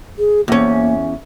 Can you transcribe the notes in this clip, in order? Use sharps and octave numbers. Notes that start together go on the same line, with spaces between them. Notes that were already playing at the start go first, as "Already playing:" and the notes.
G#4
E2 A#3 C#4